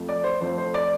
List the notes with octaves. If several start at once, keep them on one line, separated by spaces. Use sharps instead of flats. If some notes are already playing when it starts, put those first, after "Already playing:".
Already playing: F2 F3 A3
D5
C5
F2 F3 A3 C5
C5
D5